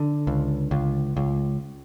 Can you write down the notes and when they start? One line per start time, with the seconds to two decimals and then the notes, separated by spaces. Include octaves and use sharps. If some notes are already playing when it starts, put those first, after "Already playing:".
Already playing: D3
0.27 C#2
0.71 C#2
1.17 C#2